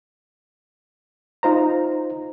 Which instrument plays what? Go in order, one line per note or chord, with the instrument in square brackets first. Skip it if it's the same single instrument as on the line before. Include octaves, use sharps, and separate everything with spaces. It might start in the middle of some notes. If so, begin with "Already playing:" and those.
[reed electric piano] D#4 F4 C5 A#5